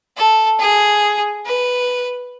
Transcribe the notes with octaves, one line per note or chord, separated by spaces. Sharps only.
A4
G#4
B4